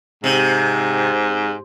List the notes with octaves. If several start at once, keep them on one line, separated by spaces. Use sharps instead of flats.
G#2 C3